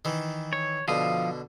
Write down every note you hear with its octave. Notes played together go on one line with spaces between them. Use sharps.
D#3 E3
C#5
B2 D3 F3 F5 D#6